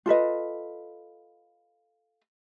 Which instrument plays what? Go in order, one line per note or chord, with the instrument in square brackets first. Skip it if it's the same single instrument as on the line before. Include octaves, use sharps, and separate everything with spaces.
[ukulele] F4 A4 B4 D#5